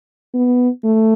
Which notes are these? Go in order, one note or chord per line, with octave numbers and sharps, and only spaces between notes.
B3
A3